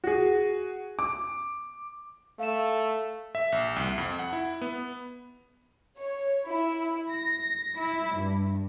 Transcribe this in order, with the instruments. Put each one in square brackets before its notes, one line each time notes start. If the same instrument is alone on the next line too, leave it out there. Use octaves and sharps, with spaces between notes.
[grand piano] F#4 G#4
D6
[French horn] A3 [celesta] F5 E7
[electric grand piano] E5
A#1
C2
F2
F#5
E4
B3
[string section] C#5
E4
A#6
E4
G2